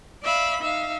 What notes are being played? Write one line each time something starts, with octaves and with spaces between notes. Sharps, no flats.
D5 E5 F5 B5
D#4 E5 F5